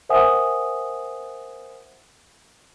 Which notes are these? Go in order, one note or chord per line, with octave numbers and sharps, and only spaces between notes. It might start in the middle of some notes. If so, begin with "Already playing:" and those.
A#4 C5 E5 F#5 G#5 D#6